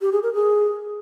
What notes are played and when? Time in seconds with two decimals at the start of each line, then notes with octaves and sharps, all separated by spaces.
0.01 G4
0.12 G#4
0.23 A#4
0.34 G#4